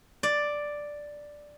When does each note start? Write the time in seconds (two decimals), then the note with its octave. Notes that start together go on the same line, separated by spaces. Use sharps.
0.23 D5